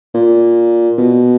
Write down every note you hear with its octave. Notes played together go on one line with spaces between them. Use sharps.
A#2
B2